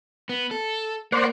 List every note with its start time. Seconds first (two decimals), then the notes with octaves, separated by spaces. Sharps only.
0.29 B3
0.51 A4
1.12 A#3 C5 D5 F#5